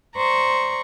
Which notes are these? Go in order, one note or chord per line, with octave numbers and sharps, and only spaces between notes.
C5 D5 A#5 C#6